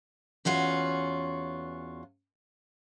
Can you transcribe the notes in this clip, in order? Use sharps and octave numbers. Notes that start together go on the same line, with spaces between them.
E2 C#4 F4 F#4